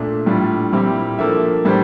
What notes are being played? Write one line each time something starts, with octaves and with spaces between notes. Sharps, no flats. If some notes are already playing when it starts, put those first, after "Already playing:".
Already playing: A#2 A3 D4
A2 G3 D4 F4
A#2 G3 C4 E4 G4
F3 A#3 D4 A4 E5
A2 G3 D4 G4 C5